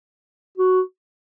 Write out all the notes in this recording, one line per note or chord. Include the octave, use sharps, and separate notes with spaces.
F#4